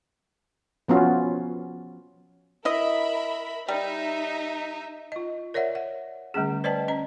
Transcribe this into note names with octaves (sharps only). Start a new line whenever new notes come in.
F3 B3 C#4 F4 F#4
E4 A#4 D#5 E5 B5
G3 D#4 E5
F4 D#5
A#4 C#5 D5 E5 F#5
F#5
D3 G3 A3 C#4 G#4
B4 C5 D5 D#5 G5 A5
C#4 D#5 A#5